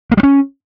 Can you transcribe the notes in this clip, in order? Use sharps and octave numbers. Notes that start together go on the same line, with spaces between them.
A#3
G3
C#4